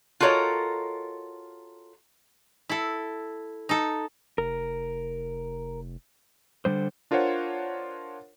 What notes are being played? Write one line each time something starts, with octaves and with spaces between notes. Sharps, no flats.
F4 F#4 A4 A#4 C#5 D#5
E4 A4
D#4 A4
F1 A#4
D3 G3 C5
D4 F4 A#4 C5 C#5 F#5